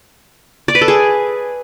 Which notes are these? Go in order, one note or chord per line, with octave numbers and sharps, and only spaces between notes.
D5
B4
A4
G#4